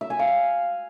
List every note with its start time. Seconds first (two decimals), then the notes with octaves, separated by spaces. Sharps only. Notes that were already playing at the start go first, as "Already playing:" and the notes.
0.01 E5
0.10 G#5
0.19 F5